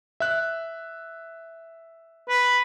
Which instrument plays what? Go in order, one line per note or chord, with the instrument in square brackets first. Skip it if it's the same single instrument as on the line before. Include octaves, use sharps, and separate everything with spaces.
[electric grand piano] E5 F#6
[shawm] B4